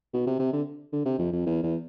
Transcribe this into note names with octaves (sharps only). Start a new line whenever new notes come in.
B2
C3
C3
D3
D3
C3
F2
F2
E2
E2